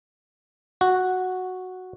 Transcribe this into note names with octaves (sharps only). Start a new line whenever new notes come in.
F#4